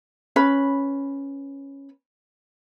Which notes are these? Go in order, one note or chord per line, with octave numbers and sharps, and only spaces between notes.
C#4 B4 B5